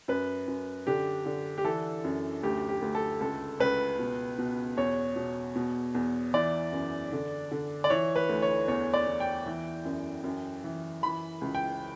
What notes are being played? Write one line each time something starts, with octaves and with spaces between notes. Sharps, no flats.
F#2 B4
F#2
D3 G4
D3
G4
E3 A4
F#2
D2 G4
G4
D2
A4
C#2 A4
C#2 B4
B2
B2
E2 C#5
B2
B2
E2
E3 D5
F#2
D3
D3
D5
E3 C#5
B4
D2
C#5
E2 C#5
D5
E2
G5
E3
F#2
F#2
E3
E3 B5
C#2
G5